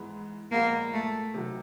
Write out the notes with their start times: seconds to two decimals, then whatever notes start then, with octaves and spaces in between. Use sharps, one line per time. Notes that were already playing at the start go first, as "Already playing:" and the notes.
Already playing: G#2 E3 G#3 B3
0.52 A#2 F3 G#3 A#3 B3
0.93 A3
1.34 C3 D#3 F#3